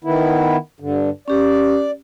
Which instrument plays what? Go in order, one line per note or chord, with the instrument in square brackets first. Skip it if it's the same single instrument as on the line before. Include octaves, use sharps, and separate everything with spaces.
[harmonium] D#3 B3 E4
G2 D3
[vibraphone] C#4 G4 [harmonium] D5